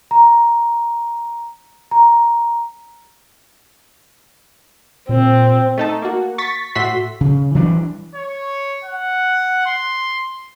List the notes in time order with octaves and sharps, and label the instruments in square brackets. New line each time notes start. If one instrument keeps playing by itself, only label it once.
[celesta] A#5
A#5
[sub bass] A#2 [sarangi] C4
[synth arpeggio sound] A3 D#4 A4
A#3 F#4
C#6 A6 B6
A2 F#4 E5 C6 B6
[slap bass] C#3
E3 G3 D4
[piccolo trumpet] C#5
F#5
C6